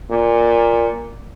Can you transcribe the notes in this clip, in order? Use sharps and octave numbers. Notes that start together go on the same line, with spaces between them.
A#2